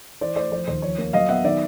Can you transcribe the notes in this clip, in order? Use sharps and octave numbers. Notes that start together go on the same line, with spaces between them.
E3 C5 D5
A3 C5 D5
F3 C5
D#2 C5
F3 C#5
A#3
F#3 D#5 F5
B3 E5 F#5
D#3 D5 E5